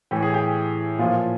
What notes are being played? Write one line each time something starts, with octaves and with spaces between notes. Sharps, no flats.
A2 E3 G4
G#4
G4
A#2 F3 F4